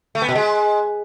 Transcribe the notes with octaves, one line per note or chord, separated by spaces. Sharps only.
A3
B3
B2
G#3